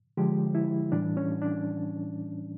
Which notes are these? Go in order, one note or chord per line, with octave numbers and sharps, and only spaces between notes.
D3 F3 G#3 G4
E4
A2 E3 G3 D4
C#4
D4